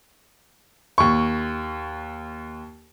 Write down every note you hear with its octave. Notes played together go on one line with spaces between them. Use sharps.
D#2 C#6